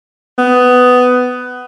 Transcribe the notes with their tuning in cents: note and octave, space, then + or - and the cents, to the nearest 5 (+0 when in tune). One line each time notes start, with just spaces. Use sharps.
B3 +15